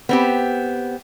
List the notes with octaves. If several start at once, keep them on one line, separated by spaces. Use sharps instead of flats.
B3 C4 G4